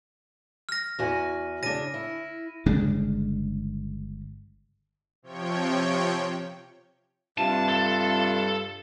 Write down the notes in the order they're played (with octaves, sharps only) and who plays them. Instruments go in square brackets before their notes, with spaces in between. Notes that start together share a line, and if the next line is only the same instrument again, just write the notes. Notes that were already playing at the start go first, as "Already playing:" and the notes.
[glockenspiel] F6 A#6
[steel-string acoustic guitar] E2 F#4 G#5
[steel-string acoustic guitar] C#3 D4 [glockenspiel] A#6 D#7
[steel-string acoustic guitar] E4
[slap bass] G1 C#3 G#3 D4
[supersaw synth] C3 F3 C#5 G5
[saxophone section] G2 C3 F4 [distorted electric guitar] A5
[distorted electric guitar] A4